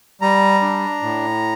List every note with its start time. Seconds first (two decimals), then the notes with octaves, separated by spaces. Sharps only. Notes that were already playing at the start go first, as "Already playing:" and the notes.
0.21 G3 A#5
0.62 D4
1.02 A2